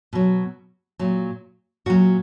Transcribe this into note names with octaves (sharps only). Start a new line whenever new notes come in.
B2 F#3
A#2 F#3
A#2 F#3 F#4